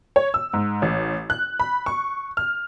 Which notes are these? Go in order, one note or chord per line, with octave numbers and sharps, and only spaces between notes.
C#5
E6
G#2
A1
F#6
B5
C#6
F6